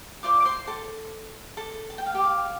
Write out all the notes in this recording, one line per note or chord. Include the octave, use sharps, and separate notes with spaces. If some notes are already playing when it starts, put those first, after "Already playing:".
F4 C5 D5 D6
D6
C5 C6
A4 A5
A4 A5
A5
G5
F5
G4 G5
F5